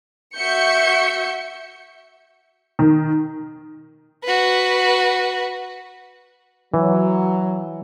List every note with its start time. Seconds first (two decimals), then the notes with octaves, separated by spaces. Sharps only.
0.36 F#4 E5 C#6 G6 C#7
2.79 D#3
4.24 F#4 B4
6.74 E3 F#3